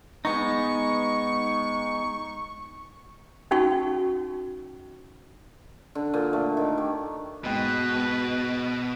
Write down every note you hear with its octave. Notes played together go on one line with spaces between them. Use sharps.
G#3 B3 D#4 C#6
C#4 D#4 F#4 F#5 C#6
D3
A#2
A3
D#3
G4
G#2 B2 G#3 B4 G5